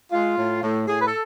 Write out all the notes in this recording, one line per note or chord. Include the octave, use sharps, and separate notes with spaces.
G#3 F4
A2
A2
A2 G#4
B4
A4